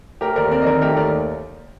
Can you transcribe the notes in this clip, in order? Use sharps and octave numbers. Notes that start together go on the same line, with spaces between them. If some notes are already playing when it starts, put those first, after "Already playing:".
A3 G4 A#4
D#2 A#4 D5
C4 A#4 D5
D#5
D#3 A#4 D5
A3 G4 A#4
D#2 A#4 D5